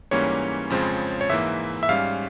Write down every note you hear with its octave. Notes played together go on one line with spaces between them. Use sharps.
G#2 E3 G3 A#3 C#4 C#5
F2 C#3 F3 G#3 C4
C#5
G#2 E3 A#3 E5
E5
G#2 G3 C#4 F5